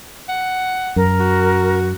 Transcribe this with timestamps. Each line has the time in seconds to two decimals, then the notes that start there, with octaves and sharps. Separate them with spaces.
0.29 F#5
0.96 F#2 A#4
1.20 F#4